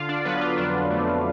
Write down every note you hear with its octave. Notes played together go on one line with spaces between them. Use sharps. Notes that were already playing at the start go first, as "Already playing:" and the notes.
Already playing: D3 F4 F5
D4 D5
F#3 B3 B4
F4
F2 D4
A3